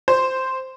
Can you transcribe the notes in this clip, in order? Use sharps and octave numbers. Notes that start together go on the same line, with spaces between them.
C5